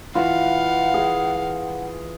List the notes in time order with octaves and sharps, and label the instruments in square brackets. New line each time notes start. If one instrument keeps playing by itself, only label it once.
[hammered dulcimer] E3 F4 [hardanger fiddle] F5 [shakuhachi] F#5
[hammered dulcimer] G#4